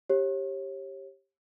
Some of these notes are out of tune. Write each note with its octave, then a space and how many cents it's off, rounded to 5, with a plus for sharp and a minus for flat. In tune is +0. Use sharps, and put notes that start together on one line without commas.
G4 +0 C#5 -35